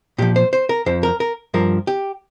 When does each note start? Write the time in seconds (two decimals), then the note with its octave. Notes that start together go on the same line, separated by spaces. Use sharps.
0.18 A#2 F3 G4
0.36 C5
0.53 C5
0.69 A#4
0.86 F2 F3 C5
1.03 A#4
1.20 A#4
1.54 G2 F3 A#4
1.87 G4